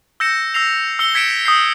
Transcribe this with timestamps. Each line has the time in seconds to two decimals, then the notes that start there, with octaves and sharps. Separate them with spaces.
0.20 E6 G6 A#6 C#7 E7
0.54 E6 A#6 C7 F7
0.99 E6 C#7 G7
1.15 G#6 B6 C#7 D7 E7
1.45 D#6 G6 C7